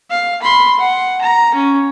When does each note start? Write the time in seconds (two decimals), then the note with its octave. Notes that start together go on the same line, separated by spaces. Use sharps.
0.11 F5
0.42 B5 C6
0.79 F#5
1.22 A#5
1.55 C#4